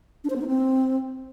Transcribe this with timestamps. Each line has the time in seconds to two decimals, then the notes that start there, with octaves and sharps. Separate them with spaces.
0.24 D4
0.30 C5
0.36 B3
0.41 D#4
0.47 C4